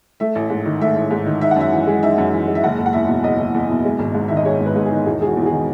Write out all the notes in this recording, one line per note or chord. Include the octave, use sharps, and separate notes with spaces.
A3 E5
A1
G#2
D#3
A3 E5
A1
G#2
D#3
D#4 E5
F#5
F#2 E5
E3
G#3
D#4 E5
F#2
E3
G#3
E5
F#1 F#5
F#1
F#5
E2 E5
B2
F#1 D#5
F#1
E2
B2
G#3
G#1
G#2
D#3 E5
D#5
G#3 C#5
G#1
B4
G#2
G#4
D#3
E1 G#4
E1 G#4
F#4
E2
F#4
G#4
D#3